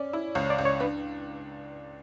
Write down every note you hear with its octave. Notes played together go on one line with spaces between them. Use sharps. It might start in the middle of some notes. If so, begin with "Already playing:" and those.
Already playing: C#4 D5
E4
C#2 C#5
D5
C#2
C#5
D4 B4